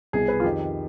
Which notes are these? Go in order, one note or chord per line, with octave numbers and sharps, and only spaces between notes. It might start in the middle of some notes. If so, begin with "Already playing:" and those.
C2 B2 G#4
B4
F4
F2 D#3 G4